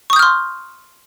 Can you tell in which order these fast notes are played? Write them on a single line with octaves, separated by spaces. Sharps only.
C#6 D#6 G6 F6 C6